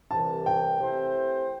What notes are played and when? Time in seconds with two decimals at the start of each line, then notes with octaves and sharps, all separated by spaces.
0.11 C2 C3 E3 A5
0.46 G5
0.80 E3 A3 C4 G4 C5